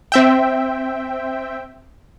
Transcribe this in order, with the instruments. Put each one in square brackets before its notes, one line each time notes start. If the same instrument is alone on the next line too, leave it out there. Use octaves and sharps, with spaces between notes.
[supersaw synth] C4 E5 G5